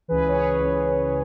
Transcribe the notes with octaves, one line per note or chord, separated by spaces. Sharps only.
C#2 C#3 E3 G#4 B4
C#5
G#4 B4
C#2 C#3 E3